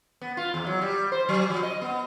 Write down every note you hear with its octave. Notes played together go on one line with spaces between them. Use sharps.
B3
F4
E2
F#3
G3
C5
F#3
F3
D#5
B3